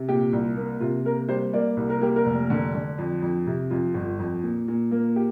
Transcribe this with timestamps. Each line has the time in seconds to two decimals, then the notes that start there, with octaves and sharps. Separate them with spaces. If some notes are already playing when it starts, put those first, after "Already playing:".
Already playing: C3
0.09 A#2 G4
0.33 C2
0.56 A#3
0.80 C3 F4
1.05 A#3 A#4
1.29 G3 C5
1.53 A#3 D5
1.77 C2
1.90 A#4
2.01 A#3 G4
2.16 A#4
2.26 F1
2.50 D3
2.75 D3
2.98 F2
3.22 F2
3.47 C3
3.70 F2 F4
3.94 G1
4.19 F2
4.43 A#2
4.68 A#2
4.91 A#3
5.16 G4